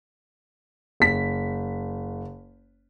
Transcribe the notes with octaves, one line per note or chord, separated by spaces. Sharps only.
F#1 B6